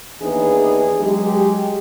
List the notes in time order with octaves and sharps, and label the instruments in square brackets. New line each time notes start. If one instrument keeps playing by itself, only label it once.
[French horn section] D#2 E3 B3 D4 D#4 G#4
F#3 G#3 G4